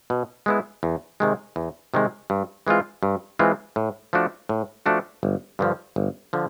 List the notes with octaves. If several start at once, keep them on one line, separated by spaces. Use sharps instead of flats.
B2
G#3 B3 E4
E2
C3 D#3 G#3
E2
C3 D#3 G#3
G2
E3 G#3 C4 F4
G2
E3 G#3 C4 F4
A2
F3 A3 D4 F#4
A2
F3 A3 D4 F#4
G1
G2 D3 F3
G1
D3 F3